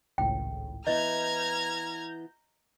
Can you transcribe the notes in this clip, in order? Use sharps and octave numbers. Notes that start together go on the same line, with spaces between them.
G#1 C#2 A2 G5
E3 B3 E4 D#5 A#5 F6 G6 G#6